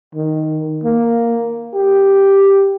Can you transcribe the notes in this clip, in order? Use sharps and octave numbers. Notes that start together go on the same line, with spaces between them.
D#3
A#3
G4